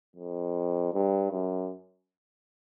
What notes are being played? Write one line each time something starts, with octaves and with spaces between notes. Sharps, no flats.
F2
G2
F#2